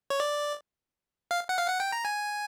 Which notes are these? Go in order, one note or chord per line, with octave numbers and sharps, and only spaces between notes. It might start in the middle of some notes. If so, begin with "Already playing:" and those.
C#5
D5
F5
F#5
F5
F#5
G5
A#5
G#5